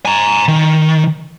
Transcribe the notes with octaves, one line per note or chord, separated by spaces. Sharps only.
G#5 A#5
D#3